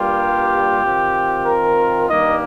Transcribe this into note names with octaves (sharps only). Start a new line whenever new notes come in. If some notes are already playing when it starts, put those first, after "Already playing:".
Already playing: G2 G3 A#3 F4 G4
D#3 C4 F4
A#4
G2 D#3 G3 A#3 D#4 D#5